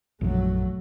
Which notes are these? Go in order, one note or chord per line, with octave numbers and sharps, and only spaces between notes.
A#1 F#2 F3 F#3 A3